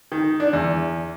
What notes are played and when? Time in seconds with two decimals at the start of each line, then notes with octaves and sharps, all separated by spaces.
0.12 D#3
0.40 D4
0.53 E2